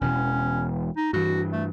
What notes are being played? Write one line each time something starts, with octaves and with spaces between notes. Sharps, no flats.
E1 B2 E3 C#4
D#4
G2 E3 F#4
A3